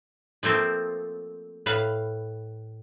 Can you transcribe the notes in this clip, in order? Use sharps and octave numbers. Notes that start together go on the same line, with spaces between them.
F3 A3 A#3 C4
A2 B4 F5